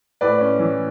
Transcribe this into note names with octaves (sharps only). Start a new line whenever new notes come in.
A2 B4 D5
C#4
E3